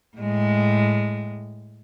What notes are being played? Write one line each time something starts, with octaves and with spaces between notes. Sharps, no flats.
A2 G#3